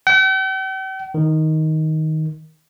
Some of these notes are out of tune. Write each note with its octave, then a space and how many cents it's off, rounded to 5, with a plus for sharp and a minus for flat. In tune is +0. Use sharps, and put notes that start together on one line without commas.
G5 -45
D#3 +10